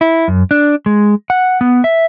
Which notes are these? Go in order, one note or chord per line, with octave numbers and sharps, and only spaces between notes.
E4
F#2
D4
G#3
F#5
B3
E5